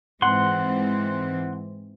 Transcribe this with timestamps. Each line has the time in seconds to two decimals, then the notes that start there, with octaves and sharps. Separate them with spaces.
0.22 G#2 E3 C4 F#5 C6